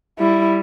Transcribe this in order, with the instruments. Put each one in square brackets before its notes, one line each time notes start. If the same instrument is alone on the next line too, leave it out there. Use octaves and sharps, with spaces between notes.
[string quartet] G3 [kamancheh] E4